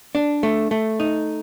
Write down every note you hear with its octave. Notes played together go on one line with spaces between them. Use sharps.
D4
A3
A3
D#4